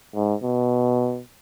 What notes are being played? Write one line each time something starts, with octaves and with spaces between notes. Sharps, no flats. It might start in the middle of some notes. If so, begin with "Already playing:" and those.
G#2
B2